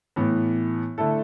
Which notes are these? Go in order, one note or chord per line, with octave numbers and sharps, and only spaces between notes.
A2 E3 B3
D3 A3 E4 A4